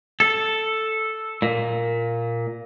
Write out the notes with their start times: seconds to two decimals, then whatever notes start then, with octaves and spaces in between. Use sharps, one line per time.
0.20 A4
1.42 A#2